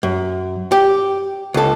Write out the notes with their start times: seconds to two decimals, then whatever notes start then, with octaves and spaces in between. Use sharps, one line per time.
0.03 F#2
0.72 G4
1.54 C#2 A4